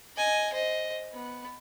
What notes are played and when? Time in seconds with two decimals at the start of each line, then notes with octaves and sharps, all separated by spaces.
0.17 D#5 G#5
0.53 C5 D#5
1.13 B3